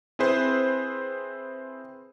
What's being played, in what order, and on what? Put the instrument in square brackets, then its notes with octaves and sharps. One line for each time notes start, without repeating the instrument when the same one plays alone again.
[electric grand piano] C4 E4 G#4 B4 C5